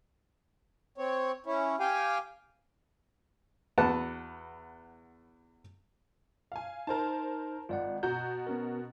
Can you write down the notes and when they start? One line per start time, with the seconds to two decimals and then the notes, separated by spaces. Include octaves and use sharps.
0.98 C4 C#5
1.46 C#4 E4
1.80 G4 F5 G5 G#5
3.78 E2 F#4 B4 F#5 A5
6.52 F5 G#5
6.87 D#4 A#4 C5 A5
7.69 G#1 F4 D5 F#5
8.03 B2 F#4 A#5 G6
8.47 B3 C#4 A#4